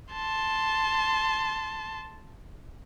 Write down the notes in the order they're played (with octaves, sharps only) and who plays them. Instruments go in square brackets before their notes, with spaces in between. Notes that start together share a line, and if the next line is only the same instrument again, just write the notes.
[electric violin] A5 C6